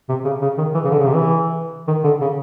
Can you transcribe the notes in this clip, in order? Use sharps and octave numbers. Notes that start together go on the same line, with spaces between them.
C3
C#3
C#3
D#3
E3
C#3
D3
C#3
C3
E3
D#3
D3
C#3